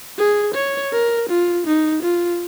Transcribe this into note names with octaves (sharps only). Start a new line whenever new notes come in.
G#4
C#5
A#4
F4
D#4
F4